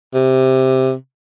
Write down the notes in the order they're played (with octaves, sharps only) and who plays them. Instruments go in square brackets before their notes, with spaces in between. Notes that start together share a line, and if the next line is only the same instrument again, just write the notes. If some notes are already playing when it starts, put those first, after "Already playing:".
[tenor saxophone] C3